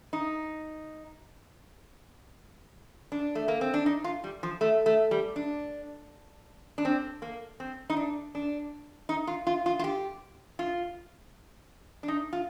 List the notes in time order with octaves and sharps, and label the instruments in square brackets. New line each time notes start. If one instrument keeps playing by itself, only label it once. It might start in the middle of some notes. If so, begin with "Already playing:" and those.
[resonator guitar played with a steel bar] D#4
D4
A3
A#3
C4
D4
D#4
F4
G3
F3
A3
A3
G3
D4
D4
C4
A#3
C4
D#4
D4
D4
D#4
F4
F4
F4
F4
G4
F4
D4
D#4
F4